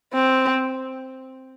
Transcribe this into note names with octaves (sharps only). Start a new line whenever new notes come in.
C4